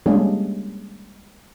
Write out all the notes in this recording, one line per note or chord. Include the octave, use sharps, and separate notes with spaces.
G3 G#3 A#3 C#4 D4 G#4